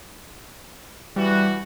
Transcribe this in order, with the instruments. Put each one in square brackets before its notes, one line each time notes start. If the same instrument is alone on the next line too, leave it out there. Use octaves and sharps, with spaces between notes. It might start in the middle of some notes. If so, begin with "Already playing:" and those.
[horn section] E3 F#4 [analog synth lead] G3